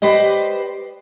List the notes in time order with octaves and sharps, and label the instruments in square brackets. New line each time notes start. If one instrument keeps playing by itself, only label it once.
[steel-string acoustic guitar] G4 B4 C5 D5 D#5